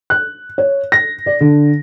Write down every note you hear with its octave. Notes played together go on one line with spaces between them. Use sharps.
F#6
C#5
A#6
D5
D3